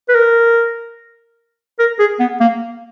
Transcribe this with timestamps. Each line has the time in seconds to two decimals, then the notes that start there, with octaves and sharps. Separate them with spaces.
0.09 B4
0.15 A#4
1.79 A#4
1.99 G#4
2.20 B3
2.40 A#3